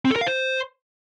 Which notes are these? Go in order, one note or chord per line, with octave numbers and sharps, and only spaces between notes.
C4
A4
A#4
F5
C5